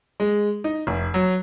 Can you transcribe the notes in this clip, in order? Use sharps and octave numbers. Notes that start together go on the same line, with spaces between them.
G#3
D#4
F1
F#3